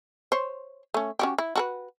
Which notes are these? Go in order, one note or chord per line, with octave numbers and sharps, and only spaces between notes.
C5 C#5
A3 C#4
C#4 F#4 G4
E4
F#4 A4 B4